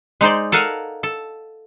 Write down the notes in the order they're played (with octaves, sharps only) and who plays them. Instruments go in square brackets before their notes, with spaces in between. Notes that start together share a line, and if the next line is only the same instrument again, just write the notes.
[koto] G#3 D#4 C5 D5
A4 A#4 F5 F#5 G#5
A4